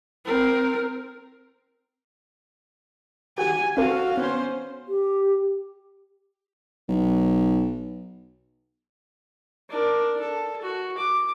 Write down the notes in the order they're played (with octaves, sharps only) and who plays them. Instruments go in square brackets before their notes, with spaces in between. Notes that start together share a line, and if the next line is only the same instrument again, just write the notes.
[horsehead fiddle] C4 A#4
[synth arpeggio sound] F#4 G4 [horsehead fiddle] G#5
[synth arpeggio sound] C4 A4 [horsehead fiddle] F#4 F5
[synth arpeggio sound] B3 [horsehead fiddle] C#4 C5
[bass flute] G4
[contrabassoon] B1
[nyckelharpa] D4 A#4
A4
F#4
D6